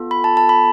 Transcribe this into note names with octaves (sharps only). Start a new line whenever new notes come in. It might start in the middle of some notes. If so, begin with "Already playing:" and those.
Already playing: B3 F4 A4
B5
A5
A5
B5